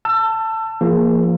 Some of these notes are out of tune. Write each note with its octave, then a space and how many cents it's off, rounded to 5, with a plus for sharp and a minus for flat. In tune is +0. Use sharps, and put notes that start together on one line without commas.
A5 +15 E6 +30
F3 -35 A#3 -5 G#4 +0